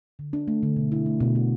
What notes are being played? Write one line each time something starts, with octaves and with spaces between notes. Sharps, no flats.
D3
D4
A3
D3
B2
E4
A3
B2
F#4